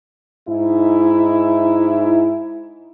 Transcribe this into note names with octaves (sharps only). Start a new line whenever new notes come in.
G#2 D#4 E4